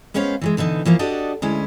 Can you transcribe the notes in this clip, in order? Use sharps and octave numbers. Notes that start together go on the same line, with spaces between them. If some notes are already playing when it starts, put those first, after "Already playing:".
G#3 B3 C#4 C5 C#5 F5
E3 F3 G#3
B2 D3 E3 D#4
E3 F3 A#3 F4
D4 F#4 G4 A4 D5 D#5
D2 G#3 C#4 E4